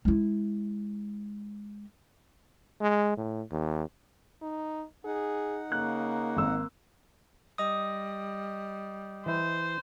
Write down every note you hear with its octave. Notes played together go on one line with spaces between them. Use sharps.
G#3 E4
G#3
A2
D#2
D#4
D#4 G#4 F#5
C#3 A#3 F#6
G#1 E6
G3 D#5 D#6
E3 E4 C5